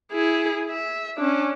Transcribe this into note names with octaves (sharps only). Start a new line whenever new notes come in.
E4 G#4
E5
C#4 D4